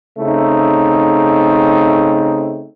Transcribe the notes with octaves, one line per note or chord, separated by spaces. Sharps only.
C#3 A3 C4 D#4